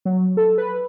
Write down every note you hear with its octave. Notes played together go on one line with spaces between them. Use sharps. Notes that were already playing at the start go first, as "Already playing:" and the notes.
F#3
A4
B4